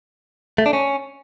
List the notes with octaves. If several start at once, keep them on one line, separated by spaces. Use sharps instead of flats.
A3
D4
C#4